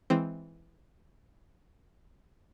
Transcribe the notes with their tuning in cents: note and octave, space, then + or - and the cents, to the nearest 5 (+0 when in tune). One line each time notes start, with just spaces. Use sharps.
E3 +0 G#3 +0 C4 +0